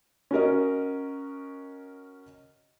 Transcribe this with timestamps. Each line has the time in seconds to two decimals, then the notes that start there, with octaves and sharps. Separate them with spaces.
0.31 C#4 F#4 A#4 D#5